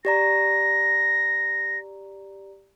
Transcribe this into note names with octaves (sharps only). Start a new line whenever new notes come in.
G4 D5 A#5 A#6